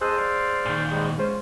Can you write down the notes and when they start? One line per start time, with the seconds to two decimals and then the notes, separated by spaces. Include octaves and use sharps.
0.01 F2 G#4 C5 D#5 A5 E6 F#6
0.17 D5 F5
0.66 A#2 D#3
0.91 G#2 G3 G#3
1.18 G#3 C#4 F4 C5